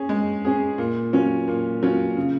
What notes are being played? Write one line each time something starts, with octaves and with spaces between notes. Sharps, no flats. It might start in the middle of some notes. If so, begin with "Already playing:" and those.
Already playing: C#4 G#4
G#3
C#4 G#4
A#2
F#3 C#4 F4
A#2
F#3 C#4 F4
C#3